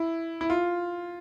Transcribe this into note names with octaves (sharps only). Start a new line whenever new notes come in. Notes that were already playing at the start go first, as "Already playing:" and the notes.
Already playing: E4
E4
F4